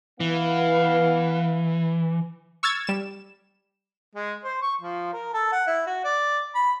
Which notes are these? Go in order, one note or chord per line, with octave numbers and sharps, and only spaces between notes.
E3 B3 F5
C#6 E6 F6 G#6 A6
G3 E7
G#3
C5
C#6
F3
A#4
A4
F#5
E4
F#4
D5
B5